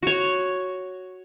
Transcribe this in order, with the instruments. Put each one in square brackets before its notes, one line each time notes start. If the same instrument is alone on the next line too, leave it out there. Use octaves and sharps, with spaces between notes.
[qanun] F#4 C#5